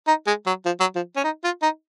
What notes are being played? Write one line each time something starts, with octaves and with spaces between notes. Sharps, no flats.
D#4
G#3
F#3
F3
F#3
F3
C#4
D#4
F4
D#4